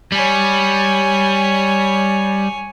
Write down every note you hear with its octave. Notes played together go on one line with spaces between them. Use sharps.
G3 C#5 G#5